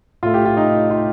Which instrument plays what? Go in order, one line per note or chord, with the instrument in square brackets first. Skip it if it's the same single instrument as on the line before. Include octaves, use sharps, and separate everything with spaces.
[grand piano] A2 A3 F4
G4
F4
D#4
F4